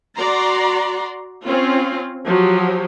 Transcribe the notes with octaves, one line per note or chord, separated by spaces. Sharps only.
F#4 D5 A#5 C6
C4 C#4 F4
F3 F#3 G4